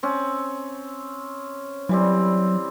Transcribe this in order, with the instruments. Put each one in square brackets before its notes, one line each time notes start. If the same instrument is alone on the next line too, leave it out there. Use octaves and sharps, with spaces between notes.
[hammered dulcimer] C4 C#4
[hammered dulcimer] E3 G3 C4 [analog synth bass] F#3